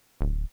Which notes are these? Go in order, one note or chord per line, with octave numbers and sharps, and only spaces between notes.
D1